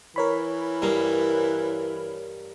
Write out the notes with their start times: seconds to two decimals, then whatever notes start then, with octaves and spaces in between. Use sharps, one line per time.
0.16 E3 A#4 C#5 B5
0.82 G2 A#3